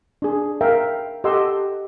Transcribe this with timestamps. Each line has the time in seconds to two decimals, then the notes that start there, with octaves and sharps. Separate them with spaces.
0.22 D4 G#4
0.61 A#4 E5 F5 G5
1.24 G4 A4 D#5 F#5 C6 E6